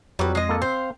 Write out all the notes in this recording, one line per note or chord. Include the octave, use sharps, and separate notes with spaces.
F2 F#3 G3 B4
G#3 D#5
A#3 A4 A5
C4 C5 F5